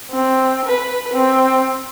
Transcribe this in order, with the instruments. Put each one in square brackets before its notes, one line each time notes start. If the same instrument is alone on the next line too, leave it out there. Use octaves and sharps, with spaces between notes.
[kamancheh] C4
B4
C4